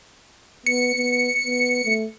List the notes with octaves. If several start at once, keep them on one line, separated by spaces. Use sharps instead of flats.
B3 C#7
B3
B3
A3